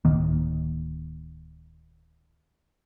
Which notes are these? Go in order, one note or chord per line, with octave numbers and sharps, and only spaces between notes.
D1 D#3 A#3